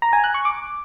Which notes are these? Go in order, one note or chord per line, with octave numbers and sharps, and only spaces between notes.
A#5
G#5
F#6
C#6
D6